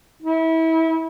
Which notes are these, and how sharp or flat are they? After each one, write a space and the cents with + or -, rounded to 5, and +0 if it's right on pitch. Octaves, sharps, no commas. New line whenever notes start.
E4 -30